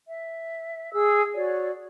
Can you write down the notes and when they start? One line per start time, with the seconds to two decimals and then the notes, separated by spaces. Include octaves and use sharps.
0.06 E5
0.92 G#4 E6
1.35 F#4 C#5 D5